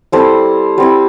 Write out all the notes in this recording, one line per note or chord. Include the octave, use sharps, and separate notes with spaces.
G3 C4 E4 A4 C5
G3 C4 E4